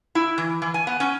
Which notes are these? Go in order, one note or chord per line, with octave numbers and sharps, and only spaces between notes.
E4
E3
E3
G#5
B3
C#4